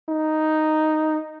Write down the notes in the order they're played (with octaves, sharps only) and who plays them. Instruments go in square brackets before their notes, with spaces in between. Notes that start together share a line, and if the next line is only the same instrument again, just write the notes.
[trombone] D#4